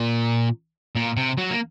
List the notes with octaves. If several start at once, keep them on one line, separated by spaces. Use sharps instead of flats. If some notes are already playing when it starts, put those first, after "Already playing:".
Already playing: A#2
A#2
C3
F#3
A#3